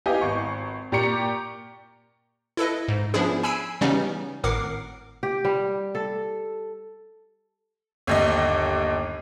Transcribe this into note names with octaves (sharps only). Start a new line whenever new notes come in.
B3 E4 G4 D#5 F5 G#5
G#1 C#6
A#2 G4 D5 A#5 C#6 C#7
E4 A4 B4 D#5
G#2
F3 B3 C#4 D4 E4 G#4
G#5 B5 E6 C7 D7 D#7
C#3 E3 G3 B3 C#4 D#4
G#1 A2 A#4 F#5 D6 C7
G4
G3
A4
G1 D#2 D#5